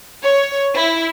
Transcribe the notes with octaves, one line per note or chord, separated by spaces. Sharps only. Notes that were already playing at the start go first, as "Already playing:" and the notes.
C#5
E4